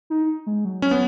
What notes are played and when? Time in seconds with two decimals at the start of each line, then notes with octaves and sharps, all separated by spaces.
0.10 D#4
0.47 G#3
0.65 F#3
0.82 C#4
0.91 B3